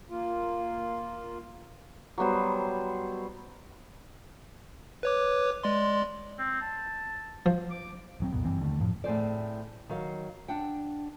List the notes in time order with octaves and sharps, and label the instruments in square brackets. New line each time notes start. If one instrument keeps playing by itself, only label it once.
[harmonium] A#3 F4
[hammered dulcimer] F#3 G3 B3 C5
[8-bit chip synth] B4 C#5 D6
G#3 D5 C6
[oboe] C4
A5
[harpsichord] F3
[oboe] D6
[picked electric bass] D#1 F#3 C4
C2 F2 A#2 B3
F#1 G2 E3 C4
D#2 D3 A3
F#2 A2 F3
[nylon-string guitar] A2 C4 G#4 C5 D5
D#3 F#3 F5
D4 F#5 G5